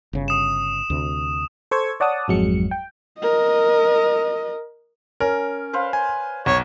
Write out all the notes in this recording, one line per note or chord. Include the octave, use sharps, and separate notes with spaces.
G1 C#3
D#6 E7
D2 C3
A4 C5 C#6 E6 G#6
C#5 D5 F#5 A5 D#6
G#1 F2 F#3 G#3 C#7
G5
A#4 D#5
C#4 A#4
B4 C5 F5
G#5
B1 C#5